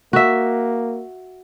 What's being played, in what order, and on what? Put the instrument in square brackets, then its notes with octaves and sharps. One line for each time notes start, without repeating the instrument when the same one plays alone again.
[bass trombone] A#3 [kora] F#4 E5